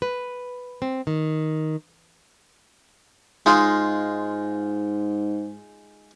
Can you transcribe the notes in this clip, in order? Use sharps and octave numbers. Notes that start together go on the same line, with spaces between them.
B4
C4
D#3
G#2 G#3 D#4 F4